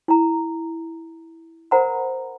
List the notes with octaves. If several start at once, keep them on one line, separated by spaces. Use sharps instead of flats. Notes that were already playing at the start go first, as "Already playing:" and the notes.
E4 A#5
A#4 C5 F#5 A#5 B5